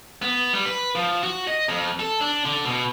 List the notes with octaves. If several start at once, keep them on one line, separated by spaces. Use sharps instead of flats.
B3
G3
B4
F3
F#4
D#5
F2
A4
D4
D3
B2